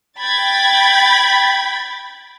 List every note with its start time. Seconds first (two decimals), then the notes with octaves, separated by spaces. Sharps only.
0.20 G5 B5 G#6 A6